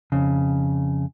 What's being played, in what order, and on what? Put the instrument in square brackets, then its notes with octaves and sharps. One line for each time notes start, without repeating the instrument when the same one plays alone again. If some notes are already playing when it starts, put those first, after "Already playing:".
[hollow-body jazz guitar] F2 C#3